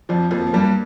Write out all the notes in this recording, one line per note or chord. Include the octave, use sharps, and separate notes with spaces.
F2 F3 D5
F2 F3 A#3
F3
G2 G3 A#3